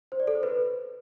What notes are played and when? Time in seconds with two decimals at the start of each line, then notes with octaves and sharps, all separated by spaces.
0.12 C5
0.20 D5
0.27 A4
0.35 C5
0.43 B4